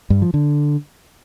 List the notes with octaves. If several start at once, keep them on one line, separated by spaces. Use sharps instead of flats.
G2
F3
D3